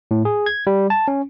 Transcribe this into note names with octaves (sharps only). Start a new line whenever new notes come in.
A2
G#4
G#6
G3
A5
C#4